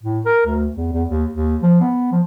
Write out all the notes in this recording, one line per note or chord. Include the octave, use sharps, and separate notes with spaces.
A2
A#4
D2
E2
E2
D#2
D#2
F3
B3
F3